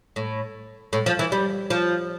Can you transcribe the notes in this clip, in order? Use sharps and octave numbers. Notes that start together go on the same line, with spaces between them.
A2
A2
F3
E3
G3
F3